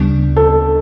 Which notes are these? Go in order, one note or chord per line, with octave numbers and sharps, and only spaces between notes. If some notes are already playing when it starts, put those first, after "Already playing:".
Already playing: D2 C#3 G3 B3 D4
A4